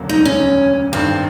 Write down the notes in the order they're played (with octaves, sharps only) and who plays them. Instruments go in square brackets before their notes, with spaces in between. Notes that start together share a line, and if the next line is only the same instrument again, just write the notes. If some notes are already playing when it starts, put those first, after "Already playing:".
Already playing: [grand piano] E1 D2 C#3 F#3 A#3
[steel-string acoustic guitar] D#4
C#4
[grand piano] G1 G2 D#3 [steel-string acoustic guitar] C4